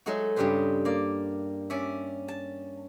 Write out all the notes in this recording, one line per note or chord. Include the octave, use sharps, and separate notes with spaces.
F#3 G#3 A3 D#4 F#4
G2 C#3 G3 G4 B4 C5
A#3 D5
C#4 D5 E5
A5